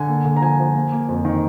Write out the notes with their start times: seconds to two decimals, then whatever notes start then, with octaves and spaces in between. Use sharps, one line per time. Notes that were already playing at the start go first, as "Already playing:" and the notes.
Already playing: D3 G#5
0.08 A#3
0.25 D3
0.36 A#5
0.41 F3 G#5
0.59 F3
0.75 A#3
0.92 A#3
1.09 F2
1.25 D#3